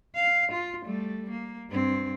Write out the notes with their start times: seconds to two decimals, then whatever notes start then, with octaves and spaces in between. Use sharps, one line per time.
0.15 F5
0.52 F4
0.83 G3 A3
1.30 A#3
1.70 G2 C4